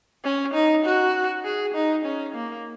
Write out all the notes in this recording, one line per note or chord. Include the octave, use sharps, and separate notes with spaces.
C#4
D#4
F#4
G#4
D#4
C#4
A#3